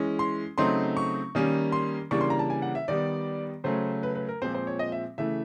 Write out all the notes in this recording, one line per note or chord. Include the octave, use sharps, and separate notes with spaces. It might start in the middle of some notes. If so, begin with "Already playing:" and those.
Already playing: E3 G#3 C#4
C6
C#3 F#3 A3 C4 D#4 C6
C#6
D#3 G3 A#3 C#4
C6
C#3 E3 G3 A#3 D4 C#6
C6
A#5
A5
G#5
F#5
E5
D#3 G3 B3 D5
C#3 F#3 A3 C#4 C5
B4
B4
A#4
A#2 F3 G#3 C4 C5
C5
C#5
D#5
E5
C#3 E3 A3 E5